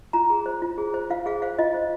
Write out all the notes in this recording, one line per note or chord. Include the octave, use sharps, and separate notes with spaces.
F4 A#5
G#4
C5
F4
G#4
C5
F4 F5
G#4 F5
C5 F5
F4 D#5
C5